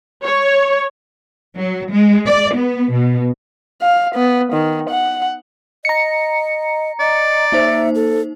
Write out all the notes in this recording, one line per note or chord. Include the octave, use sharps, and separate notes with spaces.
C#5
F#3
G#3
D5
B3
B2
F5
B3
D#3
F#5
D#5 A#5 C#7
D5 D#5
A#3 D#4 C5 E5
A4